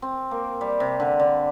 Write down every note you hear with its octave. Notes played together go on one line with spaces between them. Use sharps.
C4
A#3
G3
C3
D3
D3